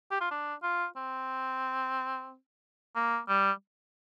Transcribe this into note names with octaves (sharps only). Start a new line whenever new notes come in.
G4
F4
D4
F4
C4
A#3
G3